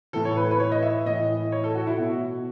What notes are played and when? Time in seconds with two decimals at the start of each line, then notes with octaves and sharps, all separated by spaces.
0.13 A2 E3 A4
0.25 C#5
0.37 B4
0.51 B4
0.60 C#5
0.72 D#5
0.82 E5
1.06 A2 E3 D#5
1.52 C#5
1.64 A4
1.75 F#4
1.87 E4
1.98 B2 F#4